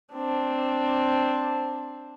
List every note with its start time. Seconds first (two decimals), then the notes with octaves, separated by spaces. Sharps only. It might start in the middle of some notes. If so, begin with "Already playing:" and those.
0.14 C4 D4